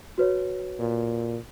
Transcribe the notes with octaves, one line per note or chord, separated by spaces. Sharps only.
F#4 B4 C#5
A#2